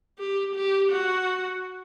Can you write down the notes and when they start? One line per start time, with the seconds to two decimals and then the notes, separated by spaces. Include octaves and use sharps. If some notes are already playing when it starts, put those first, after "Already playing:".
0.19 G4
0.56 G4
0.92 F#4